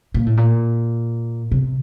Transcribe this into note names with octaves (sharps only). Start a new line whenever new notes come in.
A#2
A2
A#2
C3